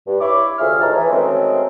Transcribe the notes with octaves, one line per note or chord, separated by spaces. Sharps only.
G2
E4 C#5 B5 D6
D2 C3 F4 G#4 E5 F6
A2 D#3 E3 C#5 A5 A#5
E3
D#3 F#3 G#3 A3 C4 C#4